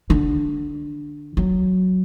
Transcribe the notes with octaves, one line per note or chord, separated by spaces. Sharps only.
D3
F#3